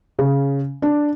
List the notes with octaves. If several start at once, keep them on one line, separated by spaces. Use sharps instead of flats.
C#3
D4